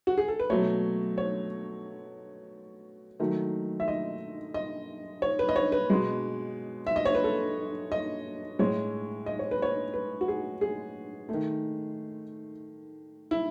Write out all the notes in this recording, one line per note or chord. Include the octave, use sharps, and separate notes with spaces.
F#4
G#4
A4
B4
B2 F#3 A3 C#5
C#5
D#3 F#3 A3
E5
D#5
D#5
C#5
B4
D#5
C#5
B4
B2 G#3
E5
D#5
C#5
B4
A4
D#5
A2 G#3 C#5
D#5
C#5
B4
C#5
B4
F#4
G#4
G#4
D#3 A3
E4